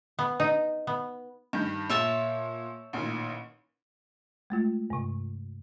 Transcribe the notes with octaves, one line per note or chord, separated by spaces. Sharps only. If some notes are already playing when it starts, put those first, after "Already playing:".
B3
D#4
B3
G2 D#3 G6
A#2 C#5 E5 A5
A1 A#2 D#3
G#3 A3 F4
G2 C3